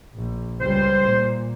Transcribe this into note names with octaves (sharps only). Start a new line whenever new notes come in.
A#1
C#2 G3 C5
A#2